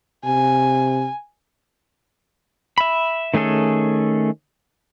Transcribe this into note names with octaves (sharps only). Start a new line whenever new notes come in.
C3 G#5
E5 B5
D#3 A3 C#4 G#4 A4